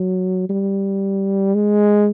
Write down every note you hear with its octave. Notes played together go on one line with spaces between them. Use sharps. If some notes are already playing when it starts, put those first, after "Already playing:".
Already playing: F#3
G3
G#3